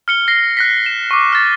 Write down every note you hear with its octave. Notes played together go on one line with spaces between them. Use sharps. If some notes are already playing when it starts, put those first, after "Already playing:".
F6 C#7 G7
A#6 C7
F#6 A#6 B6
E7
C#6 D6
F6 A6